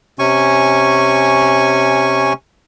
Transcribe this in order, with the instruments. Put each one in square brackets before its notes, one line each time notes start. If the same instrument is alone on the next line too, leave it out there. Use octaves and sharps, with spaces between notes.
[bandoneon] C3 C#4 G#5 C#6